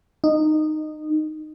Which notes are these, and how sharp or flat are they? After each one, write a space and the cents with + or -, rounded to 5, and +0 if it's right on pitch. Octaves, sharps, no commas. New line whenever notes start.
D#4 -15